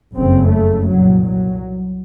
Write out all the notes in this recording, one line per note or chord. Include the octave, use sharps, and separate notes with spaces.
F#1 F2 C#3 C4
A3
C2 A#2 F#3
F#3